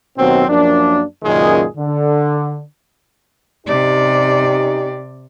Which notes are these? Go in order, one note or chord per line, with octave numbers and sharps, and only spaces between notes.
D#2 B2 F#3 C4
F#2 F3 A#3 D4
C#2 F#2 A#2 D#3 G#3 G#4
D3
C3 C#4 D#4 G4 D5